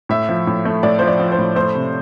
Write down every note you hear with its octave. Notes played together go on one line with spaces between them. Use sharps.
A2 E5
F3
A2
A3
A2 D5
F3 C5
D5
F3
C5
A2
A3 C5
C3